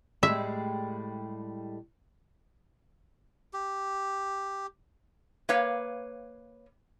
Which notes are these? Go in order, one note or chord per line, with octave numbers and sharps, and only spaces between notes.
A2 G3 G#3 E5
G4
A#3 B4 C#5 F5